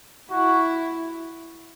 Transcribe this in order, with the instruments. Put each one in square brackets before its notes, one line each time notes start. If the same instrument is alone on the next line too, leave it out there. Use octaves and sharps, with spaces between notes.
[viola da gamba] E4 [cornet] F#4